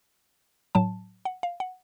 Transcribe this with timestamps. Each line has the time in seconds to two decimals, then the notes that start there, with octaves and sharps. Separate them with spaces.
0.75 A2 F#3 A5
1.25 F#5
1.43 F5
1.60 F#5